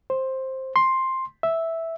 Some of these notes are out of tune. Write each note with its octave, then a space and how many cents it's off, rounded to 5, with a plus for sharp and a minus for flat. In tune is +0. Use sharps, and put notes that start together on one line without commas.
C5 +10
C6 +5
E5 -5